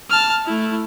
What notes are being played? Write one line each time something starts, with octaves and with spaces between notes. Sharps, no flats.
A5 F6
A3 E4